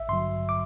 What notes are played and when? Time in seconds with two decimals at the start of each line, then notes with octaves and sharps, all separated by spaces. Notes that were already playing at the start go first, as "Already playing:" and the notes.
Already playing: A1 E5
0.09 G2 D3 F#3 C6
0.49 D6